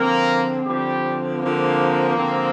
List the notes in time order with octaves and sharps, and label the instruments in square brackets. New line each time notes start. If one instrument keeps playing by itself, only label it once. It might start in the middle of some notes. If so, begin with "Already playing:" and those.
Already playing: [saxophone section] D3 F3 C4 [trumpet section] A#3 A#4
[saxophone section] D3 F3 C4 [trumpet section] G3 G4
[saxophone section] D3 F3 C4 [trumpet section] A#3
[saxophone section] D3 F3 C4